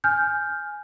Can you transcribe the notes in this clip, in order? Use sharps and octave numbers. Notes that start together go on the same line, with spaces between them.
G#5 F6 G6